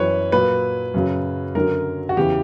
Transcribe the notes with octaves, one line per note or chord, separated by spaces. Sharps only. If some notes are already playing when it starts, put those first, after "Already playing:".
Already playing: F#2 E3 B4 C#5
A#2 F#3 B4
F#2 C#3 F#3
F#2 D3 F#3 A#4
F#4
E2 C#3 E3 G4